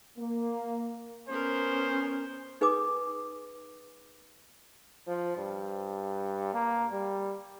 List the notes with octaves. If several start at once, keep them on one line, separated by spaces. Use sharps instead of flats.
A#3
B3 C#4 A#4 C5
D#4 G#4 B4 G#5 D6 D#6
F3
G2
A#3
G3